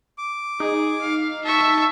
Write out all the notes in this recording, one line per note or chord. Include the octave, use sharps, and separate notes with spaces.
D6
D#4 G#4
F5
E5 A5 C#6